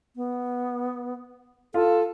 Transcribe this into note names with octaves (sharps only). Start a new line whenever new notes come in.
B3
F4 A4